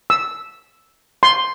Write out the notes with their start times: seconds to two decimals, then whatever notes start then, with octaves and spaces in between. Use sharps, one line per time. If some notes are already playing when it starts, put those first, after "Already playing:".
0.10 E6
1.23 C6